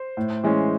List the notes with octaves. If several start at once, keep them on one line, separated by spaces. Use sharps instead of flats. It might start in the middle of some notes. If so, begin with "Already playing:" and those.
Already playing: C5
A2
E3 G#3 C#4